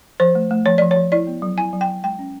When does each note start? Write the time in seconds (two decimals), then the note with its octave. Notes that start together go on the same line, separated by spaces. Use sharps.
0.20 F3 C5
0.35 A3
0.51 A3
0.66 F3 C#5
0.78 F3 D5
0.91 C#5
0.96 F3
1.12 E4 D5
1.27 B3
1.42 F#3
1.57 E4 G#5
1.73 F#3
1.81 G5
1.88 F#3
2.04 G#3 G5
2.19 C#4